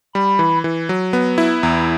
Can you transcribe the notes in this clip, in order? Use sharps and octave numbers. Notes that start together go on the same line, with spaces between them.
G3 B5
E3
E3
F#3
B3
E4
E2 A#5